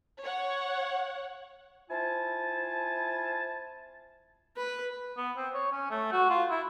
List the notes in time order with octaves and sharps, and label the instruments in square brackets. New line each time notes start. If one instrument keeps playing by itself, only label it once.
[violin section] C#5 F#5
[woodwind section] C4 E4 F4 G#5 A5
[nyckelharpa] B4
[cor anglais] B3
C4
C#5
C#4
A3
F#4
F4
E4